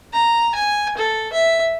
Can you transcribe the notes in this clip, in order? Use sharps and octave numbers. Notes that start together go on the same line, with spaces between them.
A#5
G#5
A4
E5